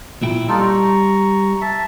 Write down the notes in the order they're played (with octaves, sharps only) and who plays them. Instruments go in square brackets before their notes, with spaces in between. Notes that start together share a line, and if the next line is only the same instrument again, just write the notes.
[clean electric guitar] A#2 E4 G5
[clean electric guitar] G3 [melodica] D#4 F4 A4
[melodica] A#5 C#6
E5 A5